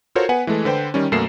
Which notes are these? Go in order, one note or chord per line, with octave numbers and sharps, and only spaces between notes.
F4 F#4 A4 A#4 C5 C#5
B3 B4 F#5 G#5
E3 G#3 A3 A4
D3 B4 C5 G5
D#3 G3 C#4
F#2 B2 A3 A#3 C7 E7